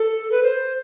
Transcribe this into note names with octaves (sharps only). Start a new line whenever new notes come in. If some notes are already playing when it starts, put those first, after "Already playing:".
Already playing: A4
B4
C5